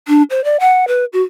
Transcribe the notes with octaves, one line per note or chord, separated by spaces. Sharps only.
D4
C5
D5
F#5
B4
F#4